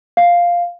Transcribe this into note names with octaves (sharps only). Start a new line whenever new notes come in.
F5